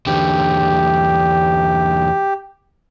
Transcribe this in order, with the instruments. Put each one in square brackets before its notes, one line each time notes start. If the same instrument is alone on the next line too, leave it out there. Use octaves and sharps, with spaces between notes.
[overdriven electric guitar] E2 D3 [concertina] G4